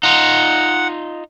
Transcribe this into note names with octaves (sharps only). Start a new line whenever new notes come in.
D#4 F4 F#5